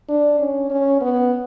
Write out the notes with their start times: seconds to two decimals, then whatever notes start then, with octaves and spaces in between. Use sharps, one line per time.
0.09 D4
0.39 C#4
0.70 C#4
1.01 B3